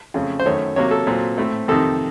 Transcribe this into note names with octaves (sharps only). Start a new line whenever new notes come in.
F2 C#3 A3 C#4
C5
F#2 D#3 A3 C#4 C#5
C3 F#3 A#3 C#5
A4
A#2 F#3 C4
A2 A3 C4
F2 C3 D#3 A4